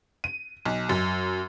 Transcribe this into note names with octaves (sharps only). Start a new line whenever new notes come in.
D#7
B1
F#2